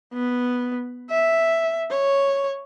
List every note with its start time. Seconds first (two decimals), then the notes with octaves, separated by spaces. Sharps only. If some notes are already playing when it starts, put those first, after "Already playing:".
0.14 B3
1.10 E5
1.90 C#5